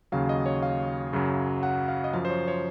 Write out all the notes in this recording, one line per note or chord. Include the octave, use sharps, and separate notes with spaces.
D#2 C#3 F#3 F5
D#5
C#5
F5
F#2 C#3 F#3
F#5
F5
D#5
F#2 F3 F5
C5
C#5
C#5